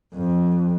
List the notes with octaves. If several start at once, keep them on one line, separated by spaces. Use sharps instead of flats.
F2